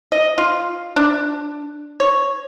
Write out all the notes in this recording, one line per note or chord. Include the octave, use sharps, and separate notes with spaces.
D#5
F4
D4
C#5